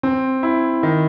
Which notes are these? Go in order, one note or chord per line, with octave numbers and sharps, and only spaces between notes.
C4
E4
D#3